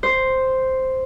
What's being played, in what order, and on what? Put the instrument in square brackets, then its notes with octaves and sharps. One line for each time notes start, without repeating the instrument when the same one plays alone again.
[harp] C5